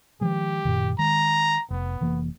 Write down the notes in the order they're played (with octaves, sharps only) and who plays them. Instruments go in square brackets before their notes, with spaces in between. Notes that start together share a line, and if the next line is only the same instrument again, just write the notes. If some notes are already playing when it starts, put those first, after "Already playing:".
[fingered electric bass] D#3 F3 G#3 [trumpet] G4
[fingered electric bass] F#2 A#2 D#3
[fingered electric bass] D#3 G#3 [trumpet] A#5
[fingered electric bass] F1 [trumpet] B3
[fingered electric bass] F1 E3 A#3